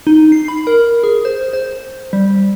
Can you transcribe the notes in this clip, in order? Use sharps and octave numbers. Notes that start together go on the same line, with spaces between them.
D#4
C7
B5
A#4
G#4
C5
C5
G3